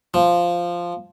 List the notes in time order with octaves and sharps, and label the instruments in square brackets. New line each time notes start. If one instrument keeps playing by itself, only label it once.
[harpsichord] F3